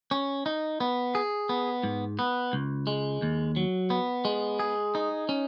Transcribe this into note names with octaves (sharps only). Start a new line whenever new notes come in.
C#4
D#4
B3
G#4
B3
G#2
B3
C#2
G#3
D#2
F#3
B3
G#3
G#4
D#4
C#4